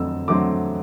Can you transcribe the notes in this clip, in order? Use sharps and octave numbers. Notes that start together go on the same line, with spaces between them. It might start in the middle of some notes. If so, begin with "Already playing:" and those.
Already playing: F2 D3 F#3 A3 C4 E6
D3 F#3 A3 C4 D6